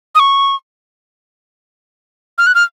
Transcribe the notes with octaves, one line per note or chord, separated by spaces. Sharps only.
D#6
C#6
F6
F#6
F6